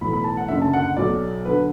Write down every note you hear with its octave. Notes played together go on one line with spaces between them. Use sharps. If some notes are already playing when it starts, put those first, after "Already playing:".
B1 A2 E3 B5
B5
A5
F#5
F#1 F#2 D3 E5
A5
F#5
B1 B2 F#3 D5
D3 F#3 B4